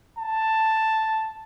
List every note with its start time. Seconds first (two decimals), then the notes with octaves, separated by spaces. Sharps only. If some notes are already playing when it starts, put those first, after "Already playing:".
0.19 A5